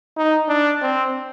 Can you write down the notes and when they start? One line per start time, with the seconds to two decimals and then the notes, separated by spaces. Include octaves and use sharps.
0.17 D#4
0.48 D4
0.82 C4